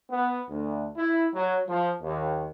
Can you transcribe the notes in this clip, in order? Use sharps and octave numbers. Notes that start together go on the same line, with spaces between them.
B3
D2
E4
F#3
F3
D#2